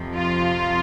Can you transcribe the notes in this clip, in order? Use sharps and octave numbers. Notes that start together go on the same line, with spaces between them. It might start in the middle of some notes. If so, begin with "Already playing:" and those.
Already playing: F2 C3 F3
F4